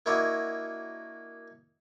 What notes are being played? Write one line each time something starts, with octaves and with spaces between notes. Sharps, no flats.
A#3 D4 E4 F#4 C#5 D#5